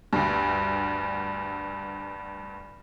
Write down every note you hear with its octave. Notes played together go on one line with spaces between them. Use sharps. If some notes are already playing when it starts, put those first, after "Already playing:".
D2 G2